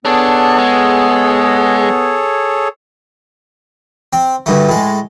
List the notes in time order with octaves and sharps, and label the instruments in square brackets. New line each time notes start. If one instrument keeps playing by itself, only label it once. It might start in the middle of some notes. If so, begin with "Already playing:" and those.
[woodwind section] B3 [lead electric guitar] D4 [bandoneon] G#4 A4 C#5
[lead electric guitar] G#3
[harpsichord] C4
D2 G2 A3
A2 G#3